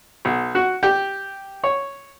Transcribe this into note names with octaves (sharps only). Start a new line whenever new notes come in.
B1
F#4
G4
C#5